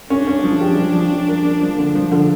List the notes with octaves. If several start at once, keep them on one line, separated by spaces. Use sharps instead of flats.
C#4 D4
C#4
F3
G4
F3
F3
C#4
A#4
A#3
F3
D3
F3
D3